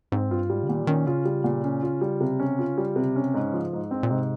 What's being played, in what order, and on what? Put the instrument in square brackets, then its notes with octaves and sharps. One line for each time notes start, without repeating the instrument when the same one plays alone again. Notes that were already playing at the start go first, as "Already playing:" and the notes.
[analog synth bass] G#2 [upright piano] C4
[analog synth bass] G2 [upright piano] F4
[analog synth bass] G#2 [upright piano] G3
[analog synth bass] C#3
[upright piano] A#2 [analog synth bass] D#3
[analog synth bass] D#3 [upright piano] C#4
[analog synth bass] C#3 [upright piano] F4
[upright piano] G3
A#2
C#4
F4
G3
C3
C#4
F4
G3
C3
C#4
G#2
F3
G#2
C4
[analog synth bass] A#2
[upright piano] G#2 [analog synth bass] C3